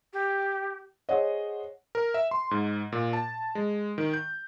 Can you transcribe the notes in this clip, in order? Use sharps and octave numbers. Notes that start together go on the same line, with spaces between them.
G4
G#4 C5 C#5 D#5 F#5
A#4
E5
C6
G#2
A#2
A5
G#3
D#3
G6